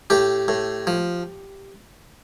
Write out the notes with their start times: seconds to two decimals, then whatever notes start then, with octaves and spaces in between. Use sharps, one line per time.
0.10 A2 G4
0.48 A2
0.87 F3